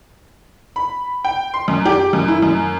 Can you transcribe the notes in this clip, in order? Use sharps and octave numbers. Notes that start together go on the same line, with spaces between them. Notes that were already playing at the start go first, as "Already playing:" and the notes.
B5
G5
C6
F#2
G4
F#2
E4
F#2